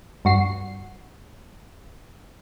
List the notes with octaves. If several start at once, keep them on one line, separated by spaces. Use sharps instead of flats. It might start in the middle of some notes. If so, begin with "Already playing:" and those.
G2 F#4 C7